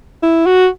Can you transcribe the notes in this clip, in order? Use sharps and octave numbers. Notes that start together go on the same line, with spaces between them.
E4
F#4